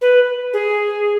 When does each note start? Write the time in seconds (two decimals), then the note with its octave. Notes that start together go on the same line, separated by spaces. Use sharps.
0.01 B4
0.53 G#4